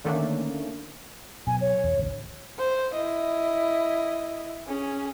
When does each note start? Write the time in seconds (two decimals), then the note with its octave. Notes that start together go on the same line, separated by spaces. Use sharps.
0.04 D3 D#3 A3 A#3 C#4 D4
1.47 B2 F#3 G#5
1.61 C#5
1.84 E2
1.98 A1 D2
2.59 C5
2.94 E4 D#5
4.67 C#4 G#4